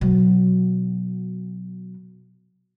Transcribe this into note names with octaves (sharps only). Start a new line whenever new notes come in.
B2 F#3